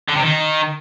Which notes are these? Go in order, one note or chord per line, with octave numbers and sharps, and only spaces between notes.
D3
C3
D#3